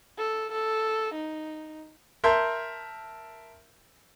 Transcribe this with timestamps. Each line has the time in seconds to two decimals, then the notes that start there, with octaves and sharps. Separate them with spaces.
0.18 A4
0.52 A4
1.14 D#4
2.24 A#4 E5 A5 C6 G6